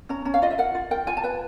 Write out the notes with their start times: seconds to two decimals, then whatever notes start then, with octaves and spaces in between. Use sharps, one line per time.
0.09 C#4 A#5
0.25 C#4 A#5
0.34 F5
0.42 F4 D#5
0.51 E5
0.58 A#4 F#5
0.75 F4
0.91 A#4 G5
1.07 F4 G#5
1.17 A5
1.24 B4 G#5